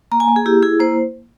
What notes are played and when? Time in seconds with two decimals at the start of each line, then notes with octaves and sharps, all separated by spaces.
0.12 A#3 A#5
0.20 G#5
0.28 A#3
0.36 G#4
0.46 E4 G4
0.63 E4 G#4
0.80 A#3 C5